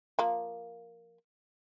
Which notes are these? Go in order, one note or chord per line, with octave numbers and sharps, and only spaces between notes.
F3 A#3